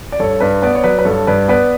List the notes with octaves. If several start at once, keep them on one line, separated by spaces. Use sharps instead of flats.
D5
G2 A4 C#5
G2 B4 D5
B3 B4 D5
C#5
F#3 B4 D5
B4
G2 A4 C#5
G2 B4 D5
B3 B4 D5